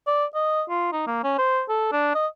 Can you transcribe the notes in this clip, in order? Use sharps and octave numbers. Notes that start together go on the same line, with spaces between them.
D5
D#5
F4
D#4
A#3
C#4
C5
A4
D4
D#5